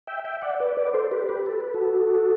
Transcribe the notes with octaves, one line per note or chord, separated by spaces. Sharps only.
E5 G5
E5 G5
D5 F#5
B4 D5
B4 D5
A4 C5
G4 B4
G4 B4
A4
B4
F#4 A4